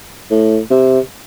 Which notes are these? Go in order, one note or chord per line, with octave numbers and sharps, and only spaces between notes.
A2
C3